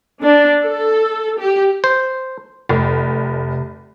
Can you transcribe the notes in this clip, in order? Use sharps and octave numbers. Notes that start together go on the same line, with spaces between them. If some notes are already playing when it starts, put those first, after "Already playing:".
D4
A4
G4
C5
F1 C3